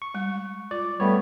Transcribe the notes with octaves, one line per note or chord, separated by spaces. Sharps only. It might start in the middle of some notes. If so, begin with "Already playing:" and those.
C#6
G3 G#3
F4 D5
G3 A3 B3 C#5